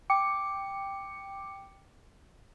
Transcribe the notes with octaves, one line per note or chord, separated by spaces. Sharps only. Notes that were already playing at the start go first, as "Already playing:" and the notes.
G5 D6 C#7